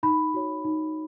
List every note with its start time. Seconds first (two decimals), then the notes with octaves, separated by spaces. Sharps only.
0.03 D#4 B5
0.34 F#4 C#5
0.65 D#4